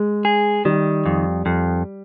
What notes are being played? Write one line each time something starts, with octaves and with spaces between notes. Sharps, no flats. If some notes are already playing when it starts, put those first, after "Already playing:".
Already playing: G#3
G#4
D#3 G3
F2
F2